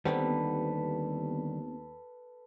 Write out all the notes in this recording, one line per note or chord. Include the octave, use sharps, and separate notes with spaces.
D#2 D3 D#3 G3 B3 C4 A4 B4